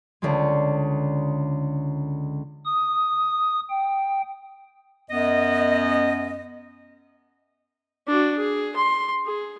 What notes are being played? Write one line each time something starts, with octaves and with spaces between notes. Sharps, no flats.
C#2 D3 G#3
D#6
G5
F#2 B3 D#5
D4 F#4
G#4
C6
G#4